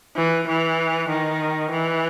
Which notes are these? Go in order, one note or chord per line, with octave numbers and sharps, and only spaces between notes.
E3
E3
D#3
E3